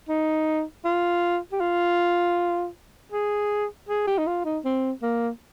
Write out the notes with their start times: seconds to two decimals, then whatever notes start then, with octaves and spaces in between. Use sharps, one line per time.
0.09 D#4
0.85 F4
1.52 G4
1.60 F4
3.12 G#4
3.89 G#4
4.07 G4
4.18 D#4
4.27 F4
4.45 D#4
4.65 C4
5.02 A#3